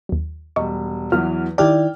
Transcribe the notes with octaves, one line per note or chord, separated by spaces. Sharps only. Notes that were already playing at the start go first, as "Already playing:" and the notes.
D#2 F#3
E1 G3 D#5 C#6
E2 E3 F#3 F4 F6
D#3 E4 G4 D5 G5 A5 F6